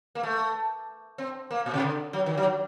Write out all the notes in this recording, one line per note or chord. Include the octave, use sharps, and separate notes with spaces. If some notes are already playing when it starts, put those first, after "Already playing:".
A#3
A3
C4
A#3
A#2
C3
D3
F#3
D#3
F#3